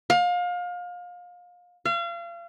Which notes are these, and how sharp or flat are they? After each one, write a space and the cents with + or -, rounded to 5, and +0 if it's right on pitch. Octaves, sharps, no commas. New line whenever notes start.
F5 +30
F5 -35